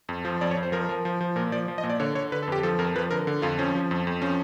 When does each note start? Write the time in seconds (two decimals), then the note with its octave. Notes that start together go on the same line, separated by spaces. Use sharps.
0.09 F2
0.25 F3
0.41 F2 D5
0.51 C#5
0.57 F2
0.63 C5
0.72 F3 A#4
0.89 F3
1.05 F3
1.21 F3
1.36 A#2 A#4
1.52 F3 D5
1.68 F3
1.78 D#5
1.84 A#2
1.90 D5
2.00 D3 C#5
2.15 D3 C#5
2.32 D3 B4
2.43 A4
2.48 F2 G4
2.63 F3 A4
2.79 F2 A#4
2.96 F3 B4
3.11 D3 A#4
3.27 D3
3.42 F2 F4
3.58 F3 C#4
3.75 F3
3.91 F2
4.07 F2
4.22 F3 C#4